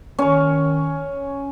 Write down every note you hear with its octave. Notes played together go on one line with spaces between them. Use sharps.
D#3 C#4 C#5